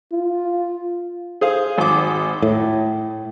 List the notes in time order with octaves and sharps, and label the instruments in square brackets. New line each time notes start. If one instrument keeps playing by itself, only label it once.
[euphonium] F4
[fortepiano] G#4 C5 F5
G#1 D6
[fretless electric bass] A2